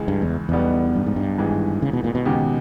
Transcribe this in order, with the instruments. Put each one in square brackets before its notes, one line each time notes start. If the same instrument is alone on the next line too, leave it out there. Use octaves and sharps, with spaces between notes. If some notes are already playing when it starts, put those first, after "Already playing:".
Already playing: [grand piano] C#2 C#3 E3 G#3
[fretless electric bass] G2
E2
[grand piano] B1 B2 G3 B3 [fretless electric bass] E2
[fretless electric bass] G2
G#2
G2
[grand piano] G#1 G#2 E3 G#3
[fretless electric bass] C#3
B2
A#2
B2
[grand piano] D#2 C#3 G#3 B3 G4